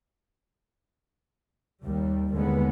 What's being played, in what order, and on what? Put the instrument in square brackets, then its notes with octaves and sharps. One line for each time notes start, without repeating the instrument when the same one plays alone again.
[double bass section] D#2 G3
D#2 D3 G#3 B3